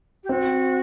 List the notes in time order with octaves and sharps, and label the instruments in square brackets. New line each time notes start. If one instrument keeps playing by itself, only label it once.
[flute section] G4
[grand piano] C4 [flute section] F#4